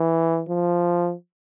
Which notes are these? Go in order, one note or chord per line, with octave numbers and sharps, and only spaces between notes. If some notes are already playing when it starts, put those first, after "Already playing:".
Already playing: E3
F3